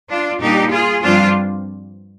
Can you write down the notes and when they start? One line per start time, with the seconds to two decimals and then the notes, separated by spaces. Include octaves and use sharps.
0.09 D4 F4
0.40 A#2 G3 A#3 D4 D#4 G4
0.71 F4 G#4
1.03 G2 F3 C4 D4 F4